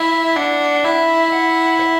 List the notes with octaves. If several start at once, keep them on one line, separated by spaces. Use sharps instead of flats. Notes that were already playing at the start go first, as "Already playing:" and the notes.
Already playing: E4 E5
D4 F#5
E4 E5
F#5
E5